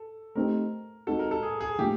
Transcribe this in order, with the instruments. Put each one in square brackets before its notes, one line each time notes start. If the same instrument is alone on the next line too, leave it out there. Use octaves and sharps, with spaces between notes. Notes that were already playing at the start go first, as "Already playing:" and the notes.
Already playing: [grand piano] A4
[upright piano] A3 C4 D#4 G4 [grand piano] A#4
[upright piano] G#3 C4 D#4 F#4 [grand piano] A4
[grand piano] A#4
A4
G#4
G#4
[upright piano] A2 F3 A#3 D4 F4 [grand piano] G4